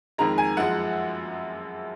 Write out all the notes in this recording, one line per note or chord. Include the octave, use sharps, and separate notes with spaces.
F2 D#3 G#3 A#5
G#5
F#2 F3 G#3 F#5